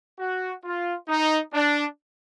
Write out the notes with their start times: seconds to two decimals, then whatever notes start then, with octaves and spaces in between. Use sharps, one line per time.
0.19 F#4
0.64 F4
1.09 D#4
1.54 D4